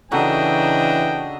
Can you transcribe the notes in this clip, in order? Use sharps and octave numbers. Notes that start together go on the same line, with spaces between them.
C#3 E3 D4 D#4 F#4 A4 D#5 G5